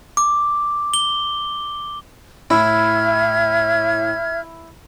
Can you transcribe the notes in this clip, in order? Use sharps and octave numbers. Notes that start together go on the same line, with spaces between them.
D6
G7
A2 E4 E5 F6 G#6